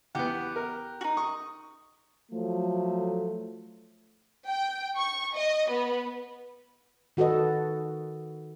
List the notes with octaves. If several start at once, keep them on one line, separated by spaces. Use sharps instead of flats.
E2 B3 G4 F#5
A#4
D#4 F#4
C#6 D#6
F3 F#3 A3
G5
C#6
D#5
B3
D#3 F#4 A4 B4 D#5